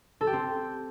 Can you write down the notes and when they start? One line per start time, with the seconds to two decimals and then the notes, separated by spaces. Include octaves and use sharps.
0.21 A4
0.27 G4
0.33 C4